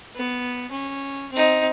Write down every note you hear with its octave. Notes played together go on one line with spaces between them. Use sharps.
B3
C#4
C4 D#4